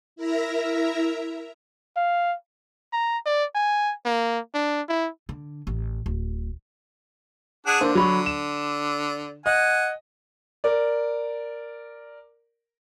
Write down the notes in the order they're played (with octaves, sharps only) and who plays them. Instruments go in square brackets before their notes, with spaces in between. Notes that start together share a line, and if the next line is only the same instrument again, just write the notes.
[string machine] E4 A#4 E5 A#5
[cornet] F5
A#5
D5
G#5
A#3
D4
E4
[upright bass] D3
A1
D1
[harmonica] D4 G#4 F#5
[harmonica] D3 [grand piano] A#3 D4 C5
[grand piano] F#3 B5 C#6
E7
[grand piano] D#5 [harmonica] F#5 G#5
[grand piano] A#4 D5